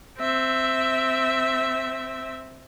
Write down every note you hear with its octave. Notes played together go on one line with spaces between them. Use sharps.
C4 E5